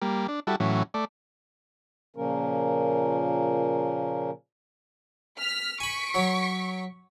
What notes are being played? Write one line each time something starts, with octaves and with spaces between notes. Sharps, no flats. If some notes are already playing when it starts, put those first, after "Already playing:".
G3 A#3
D4
G3 E4 F#4 A4
A2 E3 F#3 C#4
A3 D5
A#2 C#3 F3 A#3 C#4 A#4
F6 B6
G#5 B5 C#6 B6 D7
F#3 C#5